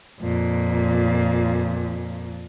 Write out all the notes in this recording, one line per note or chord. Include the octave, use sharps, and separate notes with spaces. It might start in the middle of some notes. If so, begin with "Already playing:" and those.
F2 A#2